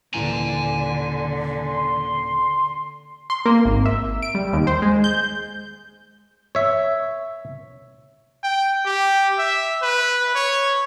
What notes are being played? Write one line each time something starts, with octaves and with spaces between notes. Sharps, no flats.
D#1 D3 E3 G#5 A#5 G7
C6
C6
A#3
G#1
E5
D7
G3
D#2
C5
G#3
G6
C#5 E5
G5
G4
E5
B4
C#5